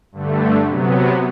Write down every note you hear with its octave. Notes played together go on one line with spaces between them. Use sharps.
G2 D3 A3
C3 F#3 B3